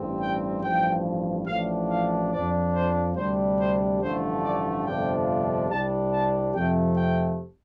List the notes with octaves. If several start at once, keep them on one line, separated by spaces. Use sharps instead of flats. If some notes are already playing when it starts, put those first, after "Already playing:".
Already playing: A1 G2 G3 C4
G5
A1 G2 F3 G5
A1 A2 F3 D4 F5
F5
F2 F3 D4 D5
C5
D2 C3 G3 D4 C5
C5
A1 G2 D3 F3 A3 C5
D5
G1 F2 C3 F3 D4 G5
C2 C3 G3 D4 A5
A5
F2 C3 F3 A3 G5
G5